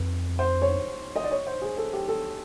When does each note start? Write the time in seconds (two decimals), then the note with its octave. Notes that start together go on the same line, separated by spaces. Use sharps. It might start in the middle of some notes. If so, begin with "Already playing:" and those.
Already playing: F2 B4
0.39 C5
0.62 C#5
1.16 D#5
1.24 D5
1.31 C#5
1.47 C5
1.62 G#4
1.77 A4
1.93 G4
2.08 A4